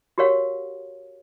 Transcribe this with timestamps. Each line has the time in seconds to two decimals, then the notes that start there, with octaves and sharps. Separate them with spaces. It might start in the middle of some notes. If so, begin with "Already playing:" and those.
0.18 F#4 G4 A#4 C#5 F5 F#5